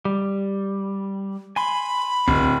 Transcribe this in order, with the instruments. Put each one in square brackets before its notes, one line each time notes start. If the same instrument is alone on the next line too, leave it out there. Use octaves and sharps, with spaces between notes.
[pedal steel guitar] G3
[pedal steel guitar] G#5 C6 [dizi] B5
[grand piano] D1 [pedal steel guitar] C4